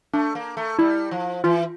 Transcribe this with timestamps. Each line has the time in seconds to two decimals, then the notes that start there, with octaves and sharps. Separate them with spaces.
0.13 A3 D4
0.35 A#3
0.57 A3
0.79 G3 E4
1.11 F3
1.44 E3 F4